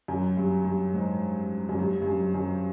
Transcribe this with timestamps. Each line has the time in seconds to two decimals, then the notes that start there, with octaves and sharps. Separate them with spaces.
0.08 F#2
0.37 G2
0.65 G2
0.94 G#2
1.69 F#2
1.79 G2
2.02 G2
2.07 F#2
2.34 F#2